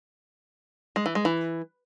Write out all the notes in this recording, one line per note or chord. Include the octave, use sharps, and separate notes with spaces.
G#3
E3
G#3
E3